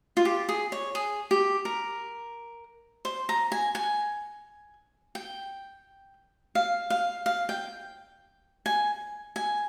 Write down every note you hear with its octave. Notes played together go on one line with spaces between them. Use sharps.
F4
G4
G#4
C#5
G#4
G4
A#4
C5
A#5
G#5
G#5
G5
F5
F5
F5
G5
G#5
G#5